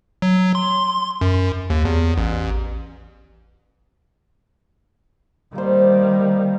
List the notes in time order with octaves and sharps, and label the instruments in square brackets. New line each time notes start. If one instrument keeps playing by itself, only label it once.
[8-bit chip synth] F#3
C6
F#2
D#2
E2
A1
[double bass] D#3 G3 [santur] A#3 C5